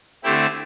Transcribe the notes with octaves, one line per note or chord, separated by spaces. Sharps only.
D3 A3 C4 E4 G4